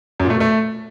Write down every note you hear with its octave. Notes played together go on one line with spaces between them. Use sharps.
F#2
A#2
A3
B2
A3